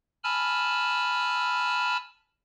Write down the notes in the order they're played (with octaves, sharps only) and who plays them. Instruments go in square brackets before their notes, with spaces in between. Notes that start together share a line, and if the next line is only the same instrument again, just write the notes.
[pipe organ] G#5 A5 B5 E6 F6